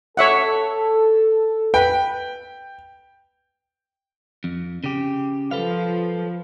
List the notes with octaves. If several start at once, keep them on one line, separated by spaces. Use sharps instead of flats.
A4 C#5 E5 F#5
B4 G5
F2
C#3 G4
F3 A4 B4 F5